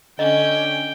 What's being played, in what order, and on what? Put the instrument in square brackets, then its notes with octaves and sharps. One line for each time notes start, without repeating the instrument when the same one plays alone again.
[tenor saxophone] D3 [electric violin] C#4 [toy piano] D#5 [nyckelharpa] G5